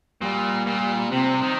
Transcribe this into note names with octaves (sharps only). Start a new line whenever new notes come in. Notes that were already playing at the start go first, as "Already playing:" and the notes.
A#2 G3
A#2
C3 C4
D#3